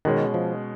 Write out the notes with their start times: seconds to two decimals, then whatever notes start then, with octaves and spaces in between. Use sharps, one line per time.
0.05 B2 D#3 G#3 C#4
0.34 F3